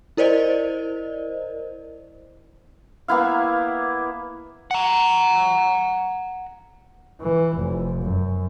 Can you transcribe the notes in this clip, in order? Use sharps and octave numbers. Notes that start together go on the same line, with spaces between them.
E4 A#4 C5 D5 D#5
A#3 B3 E4 F5
F#5 A#5
E3
F1
F#2